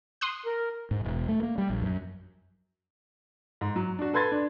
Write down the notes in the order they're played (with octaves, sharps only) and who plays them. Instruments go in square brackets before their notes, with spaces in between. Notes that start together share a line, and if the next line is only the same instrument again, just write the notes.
[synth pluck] C6 D#6 F#6
[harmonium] A#4
[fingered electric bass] G#2
E1
A3
A#3
G3
A#1
F#2
[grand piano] G#2
F#3
D4 F#4
A4 B4 C6 G#6 A6
D4